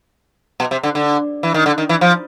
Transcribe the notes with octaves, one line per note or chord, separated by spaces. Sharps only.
B2
C3
D3
D3
E3
D#3
D3
D#3
E3
F3